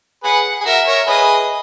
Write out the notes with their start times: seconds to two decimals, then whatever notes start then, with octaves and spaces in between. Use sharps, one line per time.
0.23 G#4 B4 F#5
0.60 G#4
0.65 F#4 A#4 E5
0.86 A#4 C#5
1.07 G#4 B4 D#5